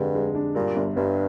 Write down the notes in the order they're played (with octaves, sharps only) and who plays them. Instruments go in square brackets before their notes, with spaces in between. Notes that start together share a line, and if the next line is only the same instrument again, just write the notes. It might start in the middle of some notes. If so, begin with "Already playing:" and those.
Already playing: [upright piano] F1 D3 G#3 [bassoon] G2
[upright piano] G#3
D4
[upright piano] G2 [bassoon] A#2
[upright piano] G1
[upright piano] G1 [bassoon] G2